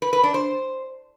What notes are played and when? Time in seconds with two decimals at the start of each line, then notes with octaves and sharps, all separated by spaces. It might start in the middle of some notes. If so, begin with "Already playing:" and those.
0.02 B4
0.13 B4
0.23 D4
0.34 C5